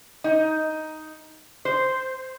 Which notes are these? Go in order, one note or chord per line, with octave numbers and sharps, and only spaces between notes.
D#4
C5